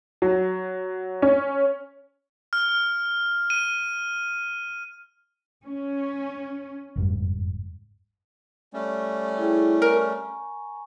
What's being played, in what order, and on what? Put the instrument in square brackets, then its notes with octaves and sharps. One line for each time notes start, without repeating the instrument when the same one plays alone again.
[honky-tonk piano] F#3
C#4
[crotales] F6
D#7
[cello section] C#4
[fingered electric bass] F#1 F2 G#2 G3
[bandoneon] G3 A3 C#4
[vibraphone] E4 G#4 G5
[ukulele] A#4 [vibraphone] G#5 A#5 C#6